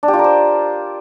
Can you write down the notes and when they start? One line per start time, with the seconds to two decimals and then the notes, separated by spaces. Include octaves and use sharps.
0.03 D4
0.08 G4
0.13 F4
0.19 A#4
0.24 C5